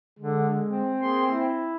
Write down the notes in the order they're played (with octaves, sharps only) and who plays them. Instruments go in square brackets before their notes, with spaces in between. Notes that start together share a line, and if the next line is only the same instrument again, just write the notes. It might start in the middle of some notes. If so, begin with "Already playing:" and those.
[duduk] D3 [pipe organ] G#3
[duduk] C4
[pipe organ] A#3 G#4 C6
E4